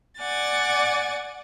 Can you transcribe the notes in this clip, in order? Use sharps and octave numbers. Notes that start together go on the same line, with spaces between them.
D5 F#5 G#5 A6